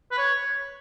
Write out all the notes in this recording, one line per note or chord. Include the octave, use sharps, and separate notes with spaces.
B4
C#5